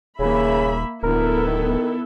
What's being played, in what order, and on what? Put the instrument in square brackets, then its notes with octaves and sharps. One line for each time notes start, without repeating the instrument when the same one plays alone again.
[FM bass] D#1 [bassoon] C#3 [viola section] A#3 E5 B5
[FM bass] D1 [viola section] B3 E4 A4 [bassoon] A#4
[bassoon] D#3